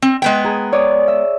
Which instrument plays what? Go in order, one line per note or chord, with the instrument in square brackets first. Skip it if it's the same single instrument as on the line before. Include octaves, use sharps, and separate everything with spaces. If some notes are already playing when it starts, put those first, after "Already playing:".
[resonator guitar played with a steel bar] C4
G#3 B3 G5
[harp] G#4 A#5
C#5 D5 D#6
E5